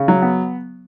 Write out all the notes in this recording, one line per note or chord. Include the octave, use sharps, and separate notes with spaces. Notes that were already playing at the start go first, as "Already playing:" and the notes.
Already playing: C#3
F#3
B3